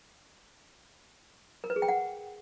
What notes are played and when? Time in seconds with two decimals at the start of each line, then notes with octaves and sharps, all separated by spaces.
1.64 A#4
1.70 B4
1.76 G#4
1.82 G5
1.88 F#5